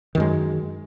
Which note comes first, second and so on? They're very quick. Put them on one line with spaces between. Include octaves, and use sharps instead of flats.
D#3 F#2 G#3